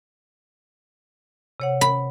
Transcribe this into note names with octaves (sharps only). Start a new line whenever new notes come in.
C3 C#5 F#5
B5